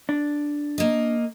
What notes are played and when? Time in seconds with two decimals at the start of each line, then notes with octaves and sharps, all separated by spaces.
0.09 D4
0.78 A#3 D#5